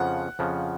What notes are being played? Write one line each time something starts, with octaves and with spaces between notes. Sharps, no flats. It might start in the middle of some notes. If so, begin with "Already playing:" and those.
Already playing: F2 C#3 F3 F#5
F2 C#3 F3